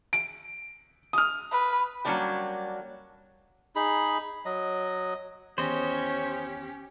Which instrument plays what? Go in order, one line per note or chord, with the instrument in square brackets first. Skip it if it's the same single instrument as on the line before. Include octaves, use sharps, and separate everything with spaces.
[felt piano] D7
D#6 F6
[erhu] B4
[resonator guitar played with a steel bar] F#3 G3 A#3 C#4 D4 G4
[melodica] D#4 G#4 B5
F#3 D#5
[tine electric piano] E2 D#3 [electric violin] C#4 G4 [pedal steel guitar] C5 D#5 [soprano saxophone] C#5